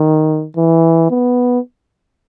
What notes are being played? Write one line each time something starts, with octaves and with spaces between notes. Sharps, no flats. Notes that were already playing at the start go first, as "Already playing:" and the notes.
Already playing: D#3
E3
B3